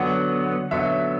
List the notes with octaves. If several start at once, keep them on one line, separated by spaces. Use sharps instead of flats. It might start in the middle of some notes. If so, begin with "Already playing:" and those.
Already playing: D3 F#3 B3 F#5
D3 F#3 B3 E5